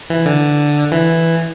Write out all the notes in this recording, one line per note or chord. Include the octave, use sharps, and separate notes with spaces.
E3
D3
E3